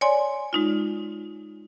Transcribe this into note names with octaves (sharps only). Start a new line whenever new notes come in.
C#5 D5 G#5 C6
G#3 D#4 F4